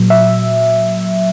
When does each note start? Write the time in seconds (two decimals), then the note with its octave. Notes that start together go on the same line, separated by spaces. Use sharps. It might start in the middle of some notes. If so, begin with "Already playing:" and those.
Already playing: A#2 F#3
0.10 E5